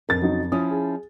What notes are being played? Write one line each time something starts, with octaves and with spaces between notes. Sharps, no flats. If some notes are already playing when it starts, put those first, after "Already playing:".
F2 A#4 A6
C#3 F#3 D#4
F3 C#4 E4 D#6
G#4